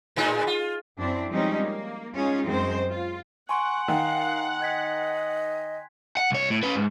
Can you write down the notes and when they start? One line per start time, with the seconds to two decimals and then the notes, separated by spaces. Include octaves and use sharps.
0.16 A2 G#3 D#4
0.47 F4
0.98 F#2 C4 D4 E4
1.30 F3 G3 G#3 C4 C#4 D#4
1.64 A#3
2.16 G#3 C#4 D#4 F4 G#4
2.45 F#2 G#3 C4 C5
2.90 F4
3.49 F#5 G#5 C6 C#6 D7
3.88 D#3 F5
4.61 D#5 F#6 G#6 B6
6.17 F#5
6.31 C2 C#5
6.50 A2
6.63 C#4 B4
6.76 G#2